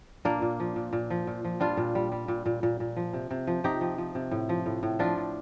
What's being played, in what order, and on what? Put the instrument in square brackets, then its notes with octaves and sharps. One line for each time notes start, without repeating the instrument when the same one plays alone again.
[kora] A#2 A#3 D4
A#2
F3
A#2
A#2
F3
A#2
F3
G3 D4 F4
A#2
G3
G3
A#2
A#2
A#2
A#2
F3
C3
C3
F3
C3 D#4 G4
F3
F3
C3
A2
F3
A2
A2
F3 D4 F4
A2